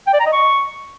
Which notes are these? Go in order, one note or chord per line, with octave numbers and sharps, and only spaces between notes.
G5
D5
A#5
D#5
C#6